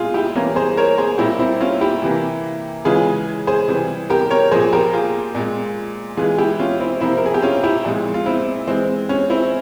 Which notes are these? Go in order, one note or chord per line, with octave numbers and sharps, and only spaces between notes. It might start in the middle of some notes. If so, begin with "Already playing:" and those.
Already playing: A#2 G#3 F4 G#4
E4 G4
E3 G3 A#3 C#4
G#4 C5
A#4 C#5
G#4 C5
A#2 G3 A#3 E4 G4
C4 E4
C#4 F4
E4 G4
C3 E3 A#3
C#3 E3 G#3 F4 G#4
G#4 C5
C3 E3 G3
G4 A#4
A#4 C#5
A#2 F3 A#3 G#4 C5
G4 A#4
F4 G#4
A#2 G#3
E3 G#3 F4 G#4
E4 G4
C#4 F4
C4 E4
C3 F3 A#3 C4 E4
A#4
G#4
G4
C#4 F4
E4 G4
A#2 F3 G#3
F4
C4 E4
E3 G#3 C4
C#4
C4 E4